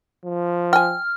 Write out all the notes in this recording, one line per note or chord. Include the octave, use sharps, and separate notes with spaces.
F3
G5 G#5 F6